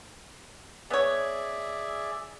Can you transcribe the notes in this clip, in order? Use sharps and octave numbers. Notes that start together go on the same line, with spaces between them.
B3 G#4 C#5 D5 E5